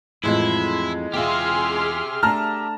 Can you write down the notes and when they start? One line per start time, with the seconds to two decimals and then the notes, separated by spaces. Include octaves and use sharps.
0.23 F2 A2 E3 G#3 E4
1.14 E2 F4 G4 G#4 E5 C6 F6
2.23 A3 D4 A5 A#5 F6